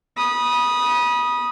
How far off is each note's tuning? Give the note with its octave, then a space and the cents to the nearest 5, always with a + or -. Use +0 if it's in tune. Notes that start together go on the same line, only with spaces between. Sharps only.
B5 -30 D#6 +0